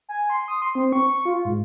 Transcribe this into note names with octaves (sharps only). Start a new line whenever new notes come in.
G#5
C6
D#6
C6
C4
C#6
C#6
F4
G#2